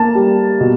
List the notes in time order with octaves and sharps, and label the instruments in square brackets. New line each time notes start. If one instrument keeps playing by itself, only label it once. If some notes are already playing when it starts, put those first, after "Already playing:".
Already playing: [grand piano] A#3 A5
G3
B2